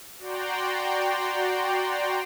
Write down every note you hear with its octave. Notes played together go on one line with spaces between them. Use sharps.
F#4 D5 G5 A#5 C6